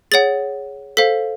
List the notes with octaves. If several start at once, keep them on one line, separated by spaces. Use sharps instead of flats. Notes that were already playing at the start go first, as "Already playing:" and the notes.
G#4 C#5 F#5 A6
A4 C5 F5 B6